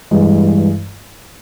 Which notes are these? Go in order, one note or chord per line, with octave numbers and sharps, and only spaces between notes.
G2 E3 G#3